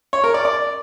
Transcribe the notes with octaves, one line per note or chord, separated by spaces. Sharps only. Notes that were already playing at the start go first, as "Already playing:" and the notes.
C#5
A#4
D5
D5